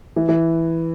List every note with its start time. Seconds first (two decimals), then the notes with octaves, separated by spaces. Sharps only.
0.16 E3
0.29 E3